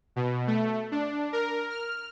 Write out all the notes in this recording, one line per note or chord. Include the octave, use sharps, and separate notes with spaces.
B2
A3
D4
A#4
F6